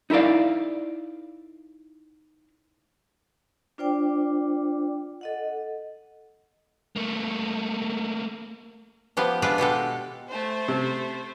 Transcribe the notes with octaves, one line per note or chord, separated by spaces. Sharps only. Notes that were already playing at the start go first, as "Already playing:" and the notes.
D#4 E4 A#4 D5 F5
D4 F4 C5 D5 G5 D6
A4 D#5 F#5
A3 A#3
F3 B3 G4
G#3 D4 F4 B4 D5 E5
B2 G#3 G4 A4
A3 C5
C3